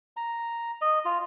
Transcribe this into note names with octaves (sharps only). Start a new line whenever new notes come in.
A#5
D#5
F4